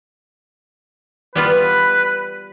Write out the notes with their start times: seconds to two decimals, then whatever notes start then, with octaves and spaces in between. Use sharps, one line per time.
1.35 G3 B3 F4 B4